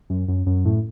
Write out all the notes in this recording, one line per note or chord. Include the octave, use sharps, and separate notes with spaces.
F#2
F#2
F#2
A2